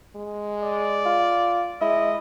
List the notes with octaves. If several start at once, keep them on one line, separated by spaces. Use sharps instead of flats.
G#3
D5
F4
G#3 E4 D#5